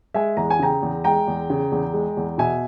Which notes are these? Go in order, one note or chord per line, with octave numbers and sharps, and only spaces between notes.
G#3 E5 G#5
E2 A#5
G#5
C#3 G5 A#5
E2
G#3 G5 A#5
E2
C#3
E2
G#3
E2
B2 E5 G#5